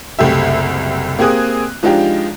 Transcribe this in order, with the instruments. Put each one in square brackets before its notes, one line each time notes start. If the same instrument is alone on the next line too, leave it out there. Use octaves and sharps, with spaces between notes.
[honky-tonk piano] F#1 C2 A3 G4 E5
A#3 C4 G4 G#4 D#6 F#6
F3 G#3 D4 D#4 F4 G4